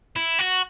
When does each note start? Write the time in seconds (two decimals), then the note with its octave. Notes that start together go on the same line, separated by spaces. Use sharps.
0.16 E4
0.39 F#4